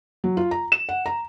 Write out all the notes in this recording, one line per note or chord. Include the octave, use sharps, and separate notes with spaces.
F#3
F4
A#5
E7
F#5
A#5